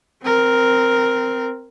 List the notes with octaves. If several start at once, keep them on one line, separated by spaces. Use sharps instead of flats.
C4 A#4